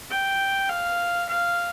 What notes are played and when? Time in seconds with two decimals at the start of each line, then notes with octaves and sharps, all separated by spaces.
0.11 G5
0.69 F5
1.29 F5